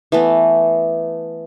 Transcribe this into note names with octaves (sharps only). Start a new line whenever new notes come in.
E3 A3 B3